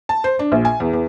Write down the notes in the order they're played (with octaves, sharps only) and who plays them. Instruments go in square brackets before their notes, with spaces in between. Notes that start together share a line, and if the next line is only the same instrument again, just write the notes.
[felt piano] A5
C5
D4
A#1
G#5
E2
E2